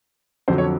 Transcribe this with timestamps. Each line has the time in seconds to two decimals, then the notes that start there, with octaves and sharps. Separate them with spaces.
0.48 F2 D3 F#3 C5
0.58 C#5